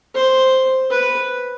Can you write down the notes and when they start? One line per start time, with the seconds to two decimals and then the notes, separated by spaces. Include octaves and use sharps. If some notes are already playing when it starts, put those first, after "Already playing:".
0.15 C5
0.91 B4